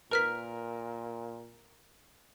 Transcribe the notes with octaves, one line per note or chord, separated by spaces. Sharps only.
A#2 A#4 B4 F6 B6